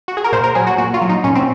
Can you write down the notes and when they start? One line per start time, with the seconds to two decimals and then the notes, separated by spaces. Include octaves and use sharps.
0.08 F#4
0.17 G#4
0.24 A#4
0.32 A#2 C5
0.44 A#4
0.55 F#3 G#4
0.67 F#4
0.78 A#2 F#4
0.94 F4
1.02 F#3
1.09 D#4
1.24 A#2 C#4
1.35 C4